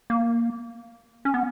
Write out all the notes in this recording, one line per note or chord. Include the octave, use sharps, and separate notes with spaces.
A#3
C#4
B3